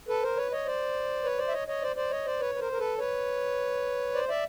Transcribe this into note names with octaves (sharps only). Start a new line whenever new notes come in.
A4 B4
A#4 C5
B4 C#5
C#5 D#5
C5 D5
B4 C#5
C5 D5
E5
C#5 D#5
C#5 D#5
C5 D5
C5 D5
C#5 D#5
C5 D5
B4 C#5
B4
A#4 C5
A#4
A4 B4
B4 C#5
C5 D5
D5 E5